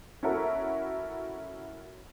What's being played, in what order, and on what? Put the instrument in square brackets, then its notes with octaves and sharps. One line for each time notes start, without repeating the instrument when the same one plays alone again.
[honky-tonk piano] C#4 E4 F#4 A4 A#4